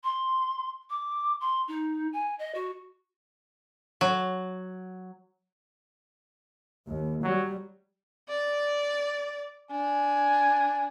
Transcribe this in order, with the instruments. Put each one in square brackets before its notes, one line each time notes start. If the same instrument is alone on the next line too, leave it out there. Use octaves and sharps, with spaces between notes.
[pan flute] C6
D6
C6
D#4
G#5
D#5
F#4
[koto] F#3
[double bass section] D#2
[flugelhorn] F#3 [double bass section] G3
[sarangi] D5
[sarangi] D4 [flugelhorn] G#5